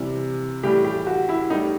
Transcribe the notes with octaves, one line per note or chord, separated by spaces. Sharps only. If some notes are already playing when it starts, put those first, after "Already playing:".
Already playing: C3 E3 G3
A2 E3 G3 G4
G4
F#4
E4
A2 G3 D#4